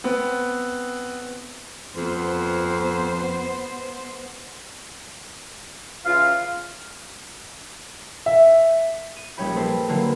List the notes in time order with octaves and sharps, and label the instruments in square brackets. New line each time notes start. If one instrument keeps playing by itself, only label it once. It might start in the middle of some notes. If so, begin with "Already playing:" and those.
[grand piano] B3 C4
[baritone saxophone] F2 [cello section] B3 C5
[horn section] C#3 E3 F4 [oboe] F5
[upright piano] E5
[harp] D#7
A#1 G3 C#4 C#5 G5 B5
A#3 C4 A4 B4 C5
D3 F#3 A#3 B3